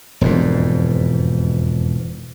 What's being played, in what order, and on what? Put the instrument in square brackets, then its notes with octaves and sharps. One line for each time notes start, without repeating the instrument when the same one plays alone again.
[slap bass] E1 F2 G#2